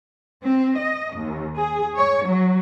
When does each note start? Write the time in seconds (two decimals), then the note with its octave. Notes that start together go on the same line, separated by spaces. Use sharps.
0.45 C4
0.79 D#5
1.15 D#2
1.58 G#4
1.97 C#5
2.27 F#3